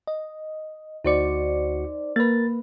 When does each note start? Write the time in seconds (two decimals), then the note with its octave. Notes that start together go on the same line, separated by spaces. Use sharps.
0.07 D#5
1.05 D2 D#4 F#4 C5 D5 C#7
2.16 A#3 A#4 B4 A6